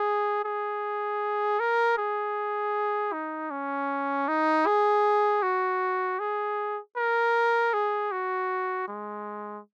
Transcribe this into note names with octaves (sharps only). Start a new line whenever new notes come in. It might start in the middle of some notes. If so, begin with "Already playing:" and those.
Already playing: G#4
G#4
A#4
G#4
D#4
C#4
D#4
G#4
F#4
G#4
A#4
G#4
F#4
G#3